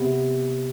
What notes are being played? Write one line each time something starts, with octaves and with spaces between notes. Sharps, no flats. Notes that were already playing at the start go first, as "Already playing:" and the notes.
Already playing: C3 B3